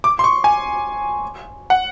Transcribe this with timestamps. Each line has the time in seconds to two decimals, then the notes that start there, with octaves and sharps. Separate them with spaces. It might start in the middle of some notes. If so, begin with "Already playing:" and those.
0.04 D6
0.19 C6
0.24 C#6
0.44 G#5
1.70 F#5